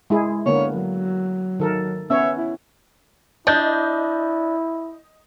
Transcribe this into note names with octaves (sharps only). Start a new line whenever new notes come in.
G#3 E4 G#4
D3 A#3 B3 C#5
F#3
D#3 A4 A#4
B3 C#4 C#5 E5
E4
D4 E4 D#5 G6